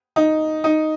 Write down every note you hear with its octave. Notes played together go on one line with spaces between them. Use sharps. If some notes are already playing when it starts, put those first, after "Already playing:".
D#4
D#4